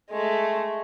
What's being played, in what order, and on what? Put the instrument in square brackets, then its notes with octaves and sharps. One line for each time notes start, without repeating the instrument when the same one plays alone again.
[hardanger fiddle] G#3 A3